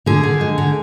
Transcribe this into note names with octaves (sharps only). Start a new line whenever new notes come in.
D3 G#4
D3
G#3
D3